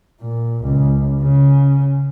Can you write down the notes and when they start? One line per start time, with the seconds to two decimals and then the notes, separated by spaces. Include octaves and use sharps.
0.22 A#2
0.64 C#2
1.21 C#3